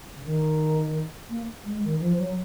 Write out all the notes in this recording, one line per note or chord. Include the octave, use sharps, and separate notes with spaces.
C#3
D#3
A#3
G#3
D#3
F3
F#3